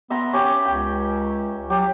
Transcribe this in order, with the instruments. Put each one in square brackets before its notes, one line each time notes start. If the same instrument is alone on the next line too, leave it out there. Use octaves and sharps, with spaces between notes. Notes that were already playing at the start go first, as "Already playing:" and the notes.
[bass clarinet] B3 [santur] E5 A#5 C6
[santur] C#4 G4
[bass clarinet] C#2 [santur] G5
[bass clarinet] F#3 [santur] G4